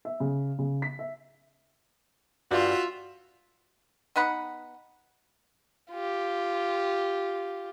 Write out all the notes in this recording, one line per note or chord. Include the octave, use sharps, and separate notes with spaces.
E5
C#3
C#3
B6
E5
G2 G3 F4 F#4 E5
B3 D#4 F#5 B5
F4 G4